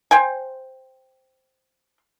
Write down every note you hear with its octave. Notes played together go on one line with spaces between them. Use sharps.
C5 G5 G#5